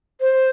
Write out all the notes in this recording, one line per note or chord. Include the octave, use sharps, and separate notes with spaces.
C5